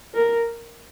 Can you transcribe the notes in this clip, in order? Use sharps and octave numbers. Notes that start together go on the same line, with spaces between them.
A#4